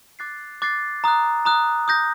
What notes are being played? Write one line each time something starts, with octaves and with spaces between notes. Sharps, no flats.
D6 F#6 A6 C7
D6 F#6 A6 C7
A#5 D#6 F#6
A#5 D#6 F#6
D#6 G6 A#6